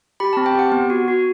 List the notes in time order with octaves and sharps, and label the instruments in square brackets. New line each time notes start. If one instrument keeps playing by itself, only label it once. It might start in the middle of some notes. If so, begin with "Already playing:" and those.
[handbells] G4 B5
C4 A5
G5
G4 F#5
B3
F#4
F#4